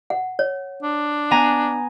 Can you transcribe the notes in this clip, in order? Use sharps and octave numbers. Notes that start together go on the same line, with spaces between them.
F#5
C#5
D4
B3 G#5 A#5